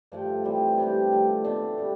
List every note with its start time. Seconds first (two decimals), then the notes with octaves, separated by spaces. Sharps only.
0.12 G2 D3 F3 A3
0.44 E3 G3 C4
0.78 C3 G3 D4 G4
1.12 D3 F3 A3
1.44 B2 A3 D4
1.78 G3 B3 D4